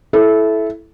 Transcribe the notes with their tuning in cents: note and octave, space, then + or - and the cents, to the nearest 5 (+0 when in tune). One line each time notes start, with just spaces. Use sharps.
E4 +0 A4 -20